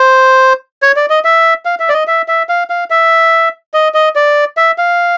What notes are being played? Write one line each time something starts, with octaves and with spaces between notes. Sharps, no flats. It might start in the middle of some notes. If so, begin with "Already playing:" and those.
Already playing: C5
C#5
D5
D#5
E5
F5
E5
D5
D#5
E5
E5
F5
F5
E5
D#5
D#5
D5
E5
F5